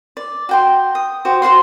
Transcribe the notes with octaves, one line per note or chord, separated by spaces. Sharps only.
D5
F#4 G5 C6
D#6
F#4 G4 C5
F#4 C5 F#5 C6